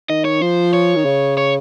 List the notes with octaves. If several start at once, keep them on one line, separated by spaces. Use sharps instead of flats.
D#3 D#5
C#5
F3 C5
C#5
D#3
C#3
C#5